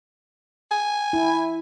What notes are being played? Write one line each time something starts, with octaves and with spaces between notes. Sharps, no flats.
G#5
E4